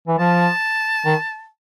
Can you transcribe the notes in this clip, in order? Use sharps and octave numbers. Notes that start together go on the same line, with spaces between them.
E3
F3 A5
D#3